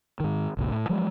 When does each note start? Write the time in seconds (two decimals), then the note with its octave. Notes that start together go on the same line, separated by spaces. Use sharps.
0.20 G#2 D#3
0.57 G#1 C#2 A#2
0.71 A2
0.89 F3 F#3 G#3